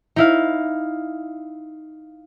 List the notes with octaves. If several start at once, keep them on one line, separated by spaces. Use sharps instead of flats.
D#4 E4 F5